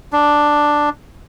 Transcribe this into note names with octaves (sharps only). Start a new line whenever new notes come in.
D4